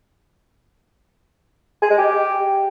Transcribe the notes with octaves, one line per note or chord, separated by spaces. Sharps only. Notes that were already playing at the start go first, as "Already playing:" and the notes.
G#4
G#3
G4